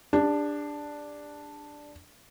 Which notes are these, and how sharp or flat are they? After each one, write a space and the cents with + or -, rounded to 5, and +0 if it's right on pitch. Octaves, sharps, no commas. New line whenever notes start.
D4 +0 G4 +45